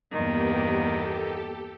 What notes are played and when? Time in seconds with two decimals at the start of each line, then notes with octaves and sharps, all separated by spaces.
0.11 E2 G2 D#3 A#3 B3 G4
0.79 G4 A4